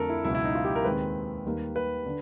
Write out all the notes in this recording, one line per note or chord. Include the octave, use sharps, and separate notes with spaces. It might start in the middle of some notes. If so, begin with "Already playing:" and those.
Already playing: F2 D3 F3 A3 C4 A4 A#4
E4
C#2 B2 F#3 E4
E4
D#4
F4
G4
A#4
D#2 D#3 G#3 C4 B4
D#2 D#3 G3 A#3
B4
D3